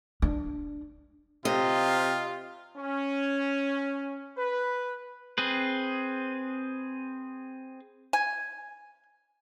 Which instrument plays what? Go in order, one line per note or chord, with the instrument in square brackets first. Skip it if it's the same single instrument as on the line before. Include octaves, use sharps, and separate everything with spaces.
[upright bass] D4
[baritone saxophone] C3 [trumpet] F4 [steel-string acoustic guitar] D#5
[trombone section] C#4
B4
[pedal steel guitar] C4 G#4 B4
[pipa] G#5